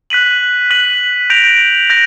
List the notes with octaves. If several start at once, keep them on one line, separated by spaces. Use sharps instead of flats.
F#6 B6 D#7 F#7
F#6 B6 D#7 F#7
G6 A#6 D7 F7
G6 A#6